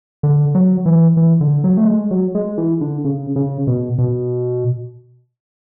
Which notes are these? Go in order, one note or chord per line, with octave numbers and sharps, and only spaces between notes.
D3
F#3
E3
E3
D3
F#3
A3
G#3
F#3
G#3
E3
D3
C#3
C#3
B2
B2